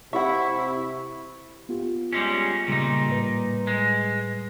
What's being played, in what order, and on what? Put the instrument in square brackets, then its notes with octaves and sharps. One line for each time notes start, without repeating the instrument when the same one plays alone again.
[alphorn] C3 [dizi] E4 [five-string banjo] E5 F#5 [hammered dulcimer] C#6
[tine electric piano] B3 F4 G4
[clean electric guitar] G3 G#3 C#4
[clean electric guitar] A#2 D#4 [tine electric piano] C#3 G3
[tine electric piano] A2 G3 B4
[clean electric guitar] G#3